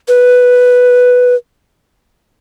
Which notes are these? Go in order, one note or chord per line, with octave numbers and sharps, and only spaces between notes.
B4